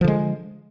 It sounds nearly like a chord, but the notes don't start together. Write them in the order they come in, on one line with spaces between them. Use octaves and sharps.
F3 D3 G#3